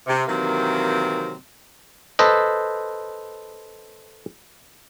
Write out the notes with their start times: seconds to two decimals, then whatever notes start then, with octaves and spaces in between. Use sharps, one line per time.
0.07 C3
0.28 C3 D#3 E3 F#3 A#3 C4
2.19 A4 B4 C5 D#5